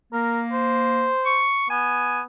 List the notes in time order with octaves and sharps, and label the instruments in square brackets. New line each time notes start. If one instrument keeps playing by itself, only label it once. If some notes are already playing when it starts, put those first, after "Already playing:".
[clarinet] A#3 [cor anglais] A#4
[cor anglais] C5
[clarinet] C#6
[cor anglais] B3 [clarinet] G#5